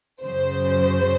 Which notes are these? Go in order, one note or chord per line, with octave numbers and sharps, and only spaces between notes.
F#2 C#3 F#3 C5